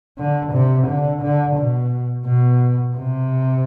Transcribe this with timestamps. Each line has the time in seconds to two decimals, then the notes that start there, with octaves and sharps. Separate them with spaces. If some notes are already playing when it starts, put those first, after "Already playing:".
0.18 D3
0.53 C3
0.88 D3
1.22 D3
1.57 B2
2.27 B2
2.96 C3